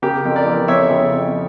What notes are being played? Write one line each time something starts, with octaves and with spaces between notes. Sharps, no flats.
C#3 G4 A#4
F2
A#4 D5
E3
F2 C#5 E5
C#3
F2